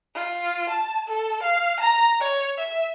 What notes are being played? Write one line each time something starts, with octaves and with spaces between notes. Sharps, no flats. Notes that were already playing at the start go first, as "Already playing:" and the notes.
F4
A5
A4
F5
A#5
C#5
E5